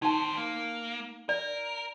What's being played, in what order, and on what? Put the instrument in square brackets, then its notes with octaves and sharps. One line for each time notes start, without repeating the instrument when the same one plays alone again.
[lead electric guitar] D#3 C5 [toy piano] D#4 A5
[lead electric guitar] A#3
[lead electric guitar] A#4 [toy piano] D5